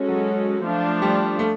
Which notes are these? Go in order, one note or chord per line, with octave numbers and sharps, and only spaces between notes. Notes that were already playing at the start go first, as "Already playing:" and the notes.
Already playing: G#3 C#4 F#4 A4
F#3
F3 A3 D4 F4
G3
A3